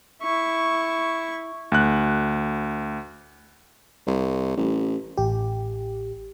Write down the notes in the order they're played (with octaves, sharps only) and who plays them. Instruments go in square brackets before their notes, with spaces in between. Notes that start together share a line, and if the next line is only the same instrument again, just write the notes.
[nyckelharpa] E4 C#6
[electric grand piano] D2 F#6
[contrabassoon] C2
A1
[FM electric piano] A1 G4